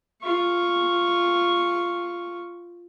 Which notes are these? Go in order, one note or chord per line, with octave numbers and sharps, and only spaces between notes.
F4 C#6